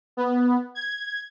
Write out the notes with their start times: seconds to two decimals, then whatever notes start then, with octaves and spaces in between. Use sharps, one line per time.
0.17 B3
0.75 G#6